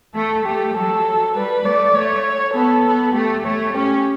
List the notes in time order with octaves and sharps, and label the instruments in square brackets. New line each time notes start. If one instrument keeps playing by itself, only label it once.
[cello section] A3 [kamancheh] A4
[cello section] A3 [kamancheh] G4
[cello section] F#3 [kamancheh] A4
[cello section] G3 [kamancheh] B4
[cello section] A3 [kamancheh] D5
[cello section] A3 [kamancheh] C#5
[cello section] B3 [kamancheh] A4
[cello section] B3
[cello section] A3 [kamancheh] G4
[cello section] A3 [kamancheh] C#5
[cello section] C#4 [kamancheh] G4